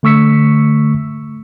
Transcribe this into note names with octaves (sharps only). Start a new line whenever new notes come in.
D3 A3 C#6 E6 B6 C#7